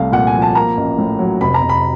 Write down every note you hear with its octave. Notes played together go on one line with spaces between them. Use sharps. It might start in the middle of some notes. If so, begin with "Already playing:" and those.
Already playing: C2 A3 F5
A#2 F#5
G#5
F3
A5
A#3 A#5
A1
A2
F#3
F1 B5
A#5
F1
B5